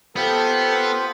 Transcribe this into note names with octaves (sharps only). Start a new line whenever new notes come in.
B3 F4 G4 A4 C5